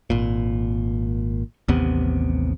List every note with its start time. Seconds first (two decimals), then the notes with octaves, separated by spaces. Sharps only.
0.10 G#1 A#2
1.68 A1 D#2 C3 B3